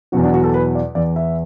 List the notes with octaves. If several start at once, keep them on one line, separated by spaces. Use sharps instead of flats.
E2 B2 F#3 F#4
D4
F#4
A4
B4
D5
E2 E3 D5
E5